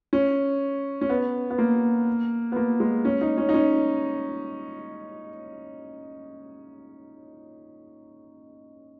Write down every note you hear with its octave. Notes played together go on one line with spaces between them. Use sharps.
C#4
C#4
B3
B3
A#3
B3
A#3
G#3
C#4
D#4
C#4
D#4
C#4